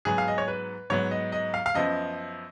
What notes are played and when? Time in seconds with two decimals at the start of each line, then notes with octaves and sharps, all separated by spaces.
0.05 G#2 F#3 B3 G#4
0.18 F5
0.28 D#5
0.38 C#5
0.48 B4
0.90 G#2 F#3 B3 C#5
1.11 D#5
1.32 D#5
1.54 F5
1.66 F5
1.74 F#2 F3 B3 D#5